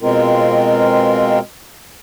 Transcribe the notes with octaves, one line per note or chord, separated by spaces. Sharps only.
B2 G#3 C4 F4 A#4